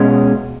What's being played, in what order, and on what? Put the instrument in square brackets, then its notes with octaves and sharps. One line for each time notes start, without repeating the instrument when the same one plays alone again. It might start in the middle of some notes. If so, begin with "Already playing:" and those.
Already playing: [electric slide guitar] B2 G#3 C#4